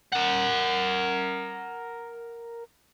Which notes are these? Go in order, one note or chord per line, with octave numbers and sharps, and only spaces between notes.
A#4 F#5